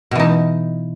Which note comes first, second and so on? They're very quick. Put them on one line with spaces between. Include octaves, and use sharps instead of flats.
B2 E3 D#4